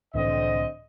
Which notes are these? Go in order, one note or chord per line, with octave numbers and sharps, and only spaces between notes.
C2 A2 D3 E3 C4 D#5